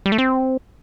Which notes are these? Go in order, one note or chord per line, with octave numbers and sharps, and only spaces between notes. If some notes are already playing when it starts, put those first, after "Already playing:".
G3
A3
C4